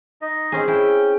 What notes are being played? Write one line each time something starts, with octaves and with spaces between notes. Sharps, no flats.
D#4 D#5
C4 C#4 G#4
C#4 E4 G5